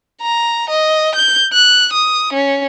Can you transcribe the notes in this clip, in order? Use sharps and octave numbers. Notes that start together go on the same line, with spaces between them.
A#5
D#5
G6
F#6
D#6
C#4